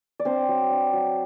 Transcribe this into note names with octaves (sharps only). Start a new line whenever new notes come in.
D5
C4 D4 C5
F#3
D4
F#3